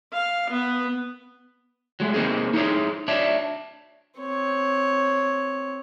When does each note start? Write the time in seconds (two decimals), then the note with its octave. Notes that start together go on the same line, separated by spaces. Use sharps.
0.13 F5
0.50 B3
2.00 F#3 G#3 A3
2.14 A#3 C4 D#4 G#4
2.54 D#4 E4 G#4 C#5
3.08 D4 C#5 E5
4.19 C4 C#5